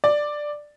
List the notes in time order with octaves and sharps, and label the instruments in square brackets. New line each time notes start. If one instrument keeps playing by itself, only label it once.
[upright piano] D5